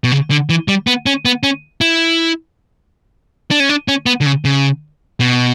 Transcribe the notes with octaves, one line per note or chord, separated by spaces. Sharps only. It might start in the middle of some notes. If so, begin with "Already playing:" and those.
B2
C#3
D3
E3
G3
B3
C#4
B3
C#4
E4
D4
C#4
D4
C#4
B3
D3
C#3
C#3
B2